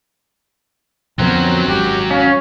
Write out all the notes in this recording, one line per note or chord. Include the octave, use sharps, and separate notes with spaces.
F2 D3 F#3 B3 C4 A#4
G#1 F#2 G4
C#4 F5